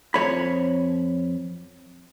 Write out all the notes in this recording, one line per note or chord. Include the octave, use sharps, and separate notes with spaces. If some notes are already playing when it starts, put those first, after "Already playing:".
F2 C#5 B5